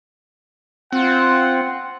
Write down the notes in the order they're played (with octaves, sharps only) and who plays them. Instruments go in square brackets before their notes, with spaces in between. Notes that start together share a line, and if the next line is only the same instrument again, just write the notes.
[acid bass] C4 [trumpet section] F4 F#5